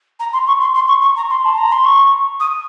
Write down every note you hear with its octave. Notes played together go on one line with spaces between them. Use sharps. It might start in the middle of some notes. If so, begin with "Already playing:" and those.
A#5
C6
C#6
C6
C6
C#6
C#6
A#5
C6
A5
A#5
C6
C#6
D#6